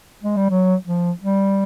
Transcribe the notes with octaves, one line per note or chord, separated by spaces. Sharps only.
G#3
G3
F#3
F3
G3